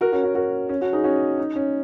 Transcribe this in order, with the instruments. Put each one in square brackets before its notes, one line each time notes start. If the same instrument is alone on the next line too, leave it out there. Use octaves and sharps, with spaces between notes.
[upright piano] F#4 A#4
C#4 F#4
C#4 F#4
F#4 A#4
C#4
C#4 F#4
D#4 G#4
C#4 F#4
D#4
C#4